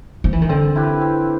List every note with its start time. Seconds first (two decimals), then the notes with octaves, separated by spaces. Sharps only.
0.24 F3
0.33 E3
0.42 D#3
0.49 D3 C4
0.76 E4 G4 B4
1.01 C4